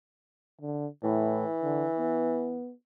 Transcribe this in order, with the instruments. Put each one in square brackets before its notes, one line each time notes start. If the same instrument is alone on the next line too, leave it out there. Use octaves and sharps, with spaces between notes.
[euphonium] D3
[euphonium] A2 [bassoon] E3
[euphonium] D3
B3